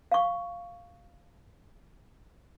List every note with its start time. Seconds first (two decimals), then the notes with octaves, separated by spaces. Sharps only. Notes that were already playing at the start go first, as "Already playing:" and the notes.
0.12 F5 C#6